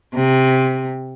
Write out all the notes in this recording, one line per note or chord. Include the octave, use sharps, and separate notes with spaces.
C3